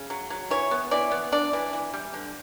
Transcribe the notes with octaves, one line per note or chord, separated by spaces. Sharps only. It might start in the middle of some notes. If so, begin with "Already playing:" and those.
Already playing: C#3
F#3
F#3
E3 C#5
B3
E3 D5
B3
D4 D5
E3
E3
G3
D3